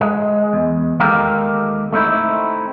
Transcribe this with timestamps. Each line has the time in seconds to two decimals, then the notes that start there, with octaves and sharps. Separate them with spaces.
0.01 G#3
0.53 E2
1.00 D#2 G#3 A#3 G4 A4 A#4
1.92 A3 C4 D#4 E4